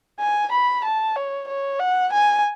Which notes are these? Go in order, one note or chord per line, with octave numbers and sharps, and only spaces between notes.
G#5
B5
A5
C#5
C#5
F#5
G#5